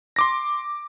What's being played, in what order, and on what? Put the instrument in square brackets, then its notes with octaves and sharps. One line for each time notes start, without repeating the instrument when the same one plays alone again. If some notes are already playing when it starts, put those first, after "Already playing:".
[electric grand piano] C6 D6 A#6